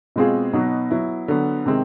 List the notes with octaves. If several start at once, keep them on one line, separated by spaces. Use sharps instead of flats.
B2 G#3 C4 F4 G#4
B2 F#3 B3 D#4
F#3 B3 E4
D3 F#3 B3
C3 D#3 G#3 C4